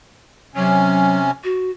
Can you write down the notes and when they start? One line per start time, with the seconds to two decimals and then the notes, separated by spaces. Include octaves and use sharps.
0.55 C3 F#3 C#4
1.43 F#4